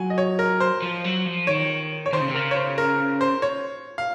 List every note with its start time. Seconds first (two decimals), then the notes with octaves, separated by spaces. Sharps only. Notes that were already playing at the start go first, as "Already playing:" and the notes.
Already playing: F#3 G#5
0.10 D#5
0.18 C#5
0.39 A#4
0.60 C5
0.82 F3
1.05 F#3
1.26 F3
1.47 D#3 C#5
2.06 C#5
2.13 D#3 C5
2.21 C#3
2.29 C3
2.34 C#3 A#4
2.51 C#5
2.56 C5
2.78 A#4
3.21 C5
3.42 C#5
3.98 F5